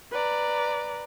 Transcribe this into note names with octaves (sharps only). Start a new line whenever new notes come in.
B4 D5 A#5